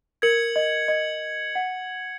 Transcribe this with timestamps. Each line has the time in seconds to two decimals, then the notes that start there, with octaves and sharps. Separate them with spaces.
0.22 A#4 G#6 C#7 F#7
0.56 D#5
0.88 D#5
1.55 F#5